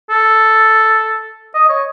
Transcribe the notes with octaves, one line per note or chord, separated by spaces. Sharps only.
A4
D#5
C#5